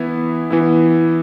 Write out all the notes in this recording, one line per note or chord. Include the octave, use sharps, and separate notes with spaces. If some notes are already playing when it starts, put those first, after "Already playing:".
Already playing: E3 B3 E4
E3 B3 E4